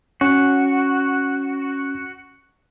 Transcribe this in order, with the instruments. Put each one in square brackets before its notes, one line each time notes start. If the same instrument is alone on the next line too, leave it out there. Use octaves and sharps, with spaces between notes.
[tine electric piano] C#4 [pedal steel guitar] F#4